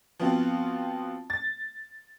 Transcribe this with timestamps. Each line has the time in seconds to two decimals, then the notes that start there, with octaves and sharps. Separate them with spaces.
0.20 F3 B3 C4 F4 F#4
1.30 A6